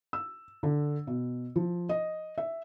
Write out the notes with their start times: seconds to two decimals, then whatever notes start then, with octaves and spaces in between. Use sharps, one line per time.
0.13 E6
0.63 D3
1.07 B2
1.56 F3
1.89 D#5
2.38 E5